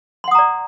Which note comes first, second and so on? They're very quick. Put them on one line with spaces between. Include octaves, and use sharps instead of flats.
C6 F#5 D#6 A#5 D5